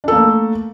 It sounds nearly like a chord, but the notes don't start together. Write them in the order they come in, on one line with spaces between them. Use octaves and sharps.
D4 A4 A#3 A3